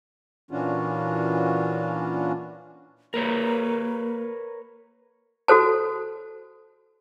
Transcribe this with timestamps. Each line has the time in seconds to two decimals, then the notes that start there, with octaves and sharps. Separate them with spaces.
0.51 A#2 E3 C#4 D4 F4 F#4
3.14 A#3 A#4 B4 C#5
5.48 F#4 A4 C5 A5